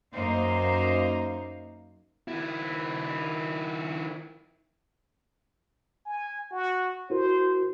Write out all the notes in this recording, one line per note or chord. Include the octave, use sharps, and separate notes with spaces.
F#2 A#3 D#4 C5 F5
D#3 E4
G#5
F#4
E4 F#4 A#4 C5